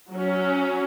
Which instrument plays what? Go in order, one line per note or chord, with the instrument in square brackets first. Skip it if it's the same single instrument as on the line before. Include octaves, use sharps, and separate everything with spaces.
[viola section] F#3 C#4